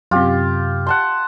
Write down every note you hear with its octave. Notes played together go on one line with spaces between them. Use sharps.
F#2 C3 F4 G4
F#5 A5 C6